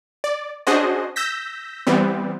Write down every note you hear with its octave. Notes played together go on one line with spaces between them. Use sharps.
D5
C#4 D4 F#4 G#4 C5 D#5
E6 G6 A#6 B6
E3 G3 B3 C4